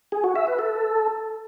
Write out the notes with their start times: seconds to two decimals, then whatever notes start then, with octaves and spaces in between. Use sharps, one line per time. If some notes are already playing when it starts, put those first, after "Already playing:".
0.12 G#4
0.24 F#4
0.35 E5
0.47 B4
0.59 A4